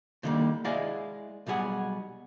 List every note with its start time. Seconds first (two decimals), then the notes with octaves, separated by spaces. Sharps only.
0.23 A2 D3 D#3 G3 A#3
0.64 G#3 E4 G#4 D5 D#5 F5
1.46 B1 B2 G3 G#4 F#5